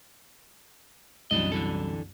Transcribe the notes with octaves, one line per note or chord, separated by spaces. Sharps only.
C2 F#2 E3 D4 D#5
D3 E3 A4